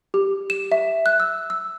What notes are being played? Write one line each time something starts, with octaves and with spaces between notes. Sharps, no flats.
G4
E7
E5
F#6
E6
E6